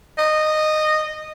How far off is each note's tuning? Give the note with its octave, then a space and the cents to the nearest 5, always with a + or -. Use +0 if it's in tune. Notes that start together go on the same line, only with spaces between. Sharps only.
D#5 -15